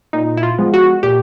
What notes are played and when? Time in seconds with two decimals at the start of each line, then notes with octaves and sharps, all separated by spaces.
0.13 A#2 D#4
0.37 E4
0.43 F4
0.58 F3 G#3 B3
0.74 F#4
1.03 A#2 G4